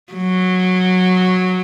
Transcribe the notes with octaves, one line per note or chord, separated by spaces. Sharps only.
F#3